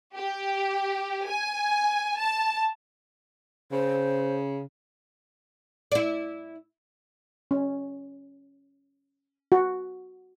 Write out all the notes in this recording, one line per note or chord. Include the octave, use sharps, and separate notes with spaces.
G4
G#5
A5
C#3 C5
E4 D5
C#4
F#4